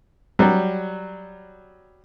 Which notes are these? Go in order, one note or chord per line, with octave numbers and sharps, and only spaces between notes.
F#3 G3